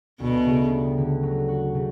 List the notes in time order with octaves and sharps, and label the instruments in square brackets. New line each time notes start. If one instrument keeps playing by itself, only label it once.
[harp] D2 [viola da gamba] B2
[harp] C#3
G3
D3
F#3
F#4
C#3